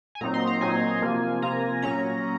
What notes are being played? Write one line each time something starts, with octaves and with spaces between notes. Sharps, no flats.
G#5
A#2 F#3 C4 D#4 A#5
C6
A#5
A#2 F#3 C4 D#4 G#5
C3 F3 A#3 F4
C3 F3 A#3 F4 A#5
A#2 F#3 C#4 A#5